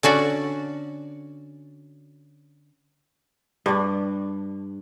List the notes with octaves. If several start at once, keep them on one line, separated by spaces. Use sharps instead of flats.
D3 C#4 F#4 D5
G2 D4